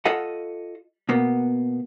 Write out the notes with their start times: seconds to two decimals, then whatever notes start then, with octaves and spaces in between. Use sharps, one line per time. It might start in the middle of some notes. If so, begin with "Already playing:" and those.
0.05 F4 A4 D#5 F#5
1.09 B2 A#3 B3